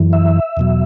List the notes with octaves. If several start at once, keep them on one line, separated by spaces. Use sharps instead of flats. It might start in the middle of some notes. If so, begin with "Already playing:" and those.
Already playing: F#2 E3
E5
E2 B2 F#3